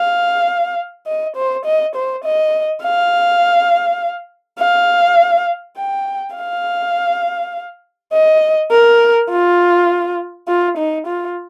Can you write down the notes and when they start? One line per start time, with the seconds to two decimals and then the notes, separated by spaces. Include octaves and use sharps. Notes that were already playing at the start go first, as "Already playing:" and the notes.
Already playing: F5
1.06 D#5
1.36 C5
1.65 D#5
1.95 C5
2.24 D#5
2.82 F5
4.59 F5
5.77 G5
6.36 F5
8.13 D#5
8.71 A#4
9.30 F4
10.48 F4
10.77 D#4
11.07 F4